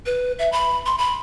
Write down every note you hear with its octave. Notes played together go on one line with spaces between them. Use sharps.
B4
E5
B5
C6
B5